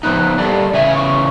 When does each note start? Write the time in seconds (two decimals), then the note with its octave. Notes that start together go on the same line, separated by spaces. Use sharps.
0.03 F3 B3 D#4 F#6
0.38 G3 A#3 A4 D5
0.73 C#3 E3 E5 G#5
0.95 C#6